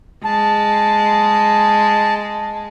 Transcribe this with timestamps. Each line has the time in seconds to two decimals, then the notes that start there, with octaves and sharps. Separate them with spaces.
0.25 G#3 A5